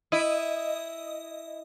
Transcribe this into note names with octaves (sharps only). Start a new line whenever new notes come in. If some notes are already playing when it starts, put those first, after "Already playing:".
E4 D#5